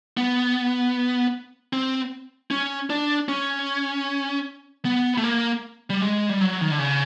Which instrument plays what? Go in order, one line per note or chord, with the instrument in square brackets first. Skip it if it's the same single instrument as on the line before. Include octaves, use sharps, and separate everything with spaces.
[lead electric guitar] B3
C4
C#4
D4
C#4
B3
A3
A#3
G3
G#3
G3
F#3
D#3
D3
C#3